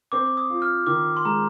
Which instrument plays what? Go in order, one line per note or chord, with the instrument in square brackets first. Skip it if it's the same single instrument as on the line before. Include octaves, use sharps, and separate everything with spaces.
[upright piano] C4 [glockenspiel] D6
[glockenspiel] D#6
[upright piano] F4
[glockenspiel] F6
[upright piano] D#3 [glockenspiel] D6
[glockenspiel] C6
[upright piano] G#3 [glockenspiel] A#5